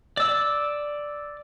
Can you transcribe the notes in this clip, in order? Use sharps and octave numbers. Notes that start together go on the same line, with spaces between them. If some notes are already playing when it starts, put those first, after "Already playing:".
D5 E6